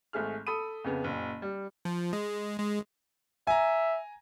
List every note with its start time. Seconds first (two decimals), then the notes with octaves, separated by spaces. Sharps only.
0.13 G#1 A3 G#4 F6
0.47 A4 B5 D#6 D#7
0.84 F2 C#3 B3
1.04 F#1 A#2
1.42 G3
1.85 F3
2.13 G#3
2.59 G#3
3.47 E5 G#5 A#5